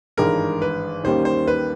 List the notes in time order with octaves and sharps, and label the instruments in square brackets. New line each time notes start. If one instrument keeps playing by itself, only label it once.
[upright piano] G#1 G2 E3 G#3 [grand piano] A#4
[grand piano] B4
[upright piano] D#2 D#3 G3 A#3 C#4 [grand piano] C5
[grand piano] C5
B4